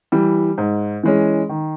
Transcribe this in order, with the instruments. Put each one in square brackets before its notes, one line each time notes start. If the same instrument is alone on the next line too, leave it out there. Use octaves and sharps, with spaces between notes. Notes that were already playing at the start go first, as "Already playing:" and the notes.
[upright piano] E3 G3
G#2
E3 G#3 C#4
D#3